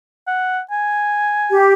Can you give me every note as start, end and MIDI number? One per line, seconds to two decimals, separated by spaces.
0.27 0.60 78
0.71 1.62 80
1.52 1.73 67